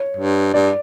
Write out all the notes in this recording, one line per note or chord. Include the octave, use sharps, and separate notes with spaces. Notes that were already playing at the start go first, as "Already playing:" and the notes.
Already playing: C#5
G2
G2 D5